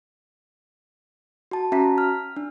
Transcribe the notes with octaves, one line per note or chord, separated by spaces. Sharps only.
F#4 A5
C#4 F#4 E5 A5 A#5 B6
F6
D4